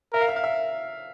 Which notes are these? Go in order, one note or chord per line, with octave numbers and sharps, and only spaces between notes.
A#4 E5
F5
E5
F5
E5